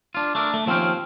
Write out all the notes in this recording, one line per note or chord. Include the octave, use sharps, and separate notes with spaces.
D4 F4
A3 D4 A#4
A3
D#2 F3 C4 C#4 F5 G5